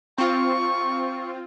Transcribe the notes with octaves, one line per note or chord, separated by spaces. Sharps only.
C4 F4 C#6